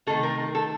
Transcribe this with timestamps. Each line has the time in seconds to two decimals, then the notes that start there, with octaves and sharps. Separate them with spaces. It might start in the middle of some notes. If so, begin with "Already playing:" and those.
0.07 C3 D#3 A3 A4
0.23 A#4
0.55 A4